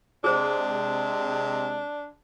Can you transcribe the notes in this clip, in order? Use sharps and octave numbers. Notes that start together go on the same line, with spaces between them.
C3 G#3 D4 G#4 C5